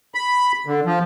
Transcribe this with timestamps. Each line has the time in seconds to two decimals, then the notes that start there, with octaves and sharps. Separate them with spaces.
0.15 B5
0.66 D3
0.85 F3